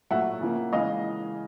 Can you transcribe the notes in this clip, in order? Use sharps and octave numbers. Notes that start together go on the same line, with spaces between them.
A#2 F#3 A3 E5 F#5
C#3 F3 A#3
C#3 E3 G#3 D#5 F5